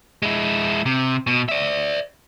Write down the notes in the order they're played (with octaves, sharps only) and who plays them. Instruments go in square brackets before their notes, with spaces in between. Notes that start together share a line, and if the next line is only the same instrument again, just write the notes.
[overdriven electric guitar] G#3 E4
C3
B2
D5 E5